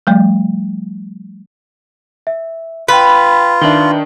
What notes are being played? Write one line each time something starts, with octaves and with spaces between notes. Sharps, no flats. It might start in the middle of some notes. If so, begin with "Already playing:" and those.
F3 G3 A3
E5
F4 B4 G5 B5 B6
D#3 D4 E5 F#7 G7